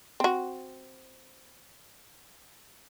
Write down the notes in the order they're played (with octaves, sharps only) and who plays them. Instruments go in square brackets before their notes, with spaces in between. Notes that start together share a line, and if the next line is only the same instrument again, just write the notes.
[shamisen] C4 F#4